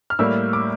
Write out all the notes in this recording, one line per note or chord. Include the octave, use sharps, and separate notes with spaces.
F6
A2 G3 A#3 E6
D6